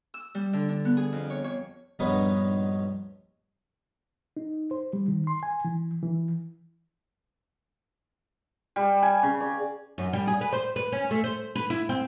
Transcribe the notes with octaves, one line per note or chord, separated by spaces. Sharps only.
E6
G3
D3
D4
B3
G#4
F2
C#5
C#5
A#1 G2 B3 D#4 B4 C#5
D#4
C5
G3
D#3
C6
G#5
E3
E3
G3
G#5
C#3
D5
F#2
G3
G#4
B4
C5
B4
C#4
A3
C5
B4
E4
C4